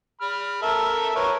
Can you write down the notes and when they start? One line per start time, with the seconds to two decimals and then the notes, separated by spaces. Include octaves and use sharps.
0.21 B5 F6
0.62 A4 A#4 E5
1.16 A#4 B4 C#5